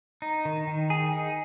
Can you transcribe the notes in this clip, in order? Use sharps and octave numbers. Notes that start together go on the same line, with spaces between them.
D#4
D#3
D#3
G#4
D#4